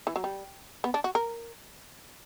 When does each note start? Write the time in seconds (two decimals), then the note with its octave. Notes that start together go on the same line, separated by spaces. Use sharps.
0.07 E3
0.16 F#3
0.24 G3
0.84 B3
0.94 D4
1.04 F#4
1.15 A#4